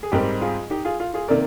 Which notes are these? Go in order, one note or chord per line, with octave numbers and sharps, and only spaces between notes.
G#4
G#2 G3 C4 G4 A#4
F4 G#4
D#4 G4
F4 G#4
F4
F4 G#4
C3 D#3 A#3 A#4 D5